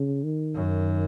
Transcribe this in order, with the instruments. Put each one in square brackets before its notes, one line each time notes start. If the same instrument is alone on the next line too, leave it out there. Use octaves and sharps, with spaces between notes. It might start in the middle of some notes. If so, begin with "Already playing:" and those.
Already playing: [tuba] C#3
D#3
[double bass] F#2